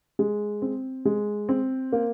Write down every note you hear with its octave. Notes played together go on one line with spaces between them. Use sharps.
G#3
C4
G#3
C4
A#3